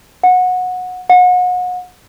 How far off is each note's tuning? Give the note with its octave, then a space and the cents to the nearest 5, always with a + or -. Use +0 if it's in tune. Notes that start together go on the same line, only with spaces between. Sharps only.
F#5 -20
F#5 -35